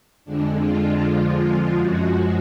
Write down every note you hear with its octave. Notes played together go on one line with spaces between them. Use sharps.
F2 D3 G#3 D4
F4
F2 D3 F3 G#3 F4
F#2 F3 G#3 F#4